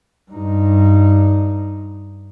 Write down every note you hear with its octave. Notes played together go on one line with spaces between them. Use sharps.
G2 D#4